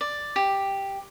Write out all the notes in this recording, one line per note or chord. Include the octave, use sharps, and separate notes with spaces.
D5
G4